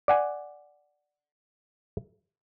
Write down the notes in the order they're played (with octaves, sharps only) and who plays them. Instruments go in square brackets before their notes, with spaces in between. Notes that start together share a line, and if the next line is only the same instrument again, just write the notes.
[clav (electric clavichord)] D5 F#5 G#5